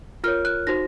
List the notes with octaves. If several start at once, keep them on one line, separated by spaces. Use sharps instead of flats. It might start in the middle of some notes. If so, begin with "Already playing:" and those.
F4 A#4 C#5 F6
F#6
D#4 F#4 C5 A#6